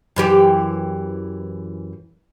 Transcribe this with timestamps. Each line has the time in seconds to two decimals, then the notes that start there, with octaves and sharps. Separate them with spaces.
0.16 F#2 E3 G4